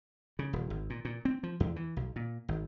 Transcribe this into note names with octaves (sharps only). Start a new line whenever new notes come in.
C#3
D#1
G#1
A#2
A#2
C4
F3
E2
E3
B1
A#2
G#1